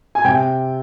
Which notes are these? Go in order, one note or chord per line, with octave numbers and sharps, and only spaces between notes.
G#5
C3 G5